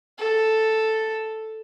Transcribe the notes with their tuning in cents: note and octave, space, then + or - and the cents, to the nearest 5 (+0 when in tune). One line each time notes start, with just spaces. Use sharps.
A4 +0